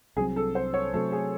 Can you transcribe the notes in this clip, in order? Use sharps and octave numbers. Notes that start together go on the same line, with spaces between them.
C2 C3 F#3 C4 G#4
A4
C5
C#5
C3 F#3 A3 A4
G#4